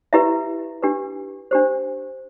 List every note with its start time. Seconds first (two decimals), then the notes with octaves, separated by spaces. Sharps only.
0.13 E4 G4 B4 E5
0.83 D4 G4 B4
1.51 D4 G4 C5